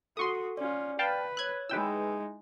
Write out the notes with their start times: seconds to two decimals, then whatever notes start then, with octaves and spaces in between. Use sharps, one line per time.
0.17 F#4 A4 C6 C#6 D#6
0.57 C#4 F4 D5
0.99 B4 F5 G5 A5
1.37 C#5 E6 F#6 G#6
1.69 G#3 D#4 E4 G#4 B4 G5 E6